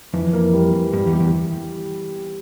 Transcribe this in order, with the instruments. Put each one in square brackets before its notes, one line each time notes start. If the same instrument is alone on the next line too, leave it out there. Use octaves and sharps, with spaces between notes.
[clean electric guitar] F2 [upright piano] E3
[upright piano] A#3
G3
E3
[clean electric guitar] G2 [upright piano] G3
[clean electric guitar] E2
[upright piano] G4
[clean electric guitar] E2